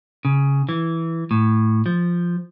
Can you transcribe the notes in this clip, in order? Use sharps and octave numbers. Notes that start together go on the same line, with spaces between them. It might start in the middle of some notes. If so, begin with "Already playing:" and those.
C#3
E3
A2
F3